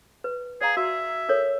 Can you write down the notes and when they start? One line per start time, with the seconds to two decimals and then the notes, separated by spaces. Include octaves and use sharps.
0.24 B4
0.61 G#4 D5 F5 A#5
0.77 F#4 E5
1.29 A4 A#4 C#5